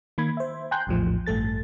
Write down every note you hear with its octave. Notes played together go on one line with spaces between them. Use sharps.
D#3 A#3 B5 G#6
C5 E5
G5 G#5 A#5 C6 F#6 G6
A#1 E2 A2 F3
A1 G2 A3 A4 A6